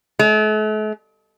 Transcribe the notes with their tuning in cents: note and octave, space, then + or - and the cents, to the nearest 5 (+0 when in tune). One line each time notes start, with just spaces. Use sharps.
A3 -45